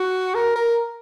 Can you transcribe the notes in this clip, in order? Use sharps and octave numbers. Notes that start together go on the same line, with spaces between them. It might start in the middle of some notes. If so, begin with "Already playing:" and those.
Already playing: F#4
A#4
A#4